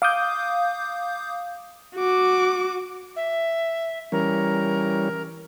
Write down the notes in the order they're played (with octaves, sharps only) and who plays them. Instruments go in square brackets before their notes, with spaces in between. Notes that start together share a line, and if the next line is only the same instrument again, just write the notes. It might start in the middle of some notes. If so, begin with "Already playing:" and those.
[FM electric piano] F5 D6 D#6 G6
[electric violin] F#4 D6
[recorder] E5
[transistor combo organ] E3 G3 C#4 [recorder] A#4